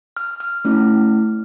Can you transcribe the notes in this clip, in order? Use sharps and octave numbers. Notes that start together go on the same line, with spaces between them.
F6
F6
A3 C#4 E4